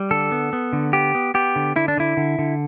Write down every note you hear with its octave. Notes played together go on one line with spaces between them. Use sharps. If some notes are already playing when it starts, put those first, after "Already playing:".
Already playing: G3
D3 A4
B3
B3
D3
B3 G4
B3
B3 G4
D3
D3 E4
D4
D3 E4
D3
D3